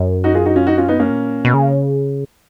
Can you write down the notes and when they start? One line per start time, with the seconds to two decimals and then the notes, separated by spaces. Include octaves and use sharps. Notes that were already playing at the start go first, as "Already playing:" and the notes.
Already playing: F#2
0.24 D#4 F#4
0.35 F4 G#4
0.46 D#4 F#4
0.56 C#4 F4
0.67 D#4 F#4
0.78 C#4 F4
0.88 B3 D#4
0.99 A#3 C#4
1.10 A#2
1.45 B2
1.54 C#3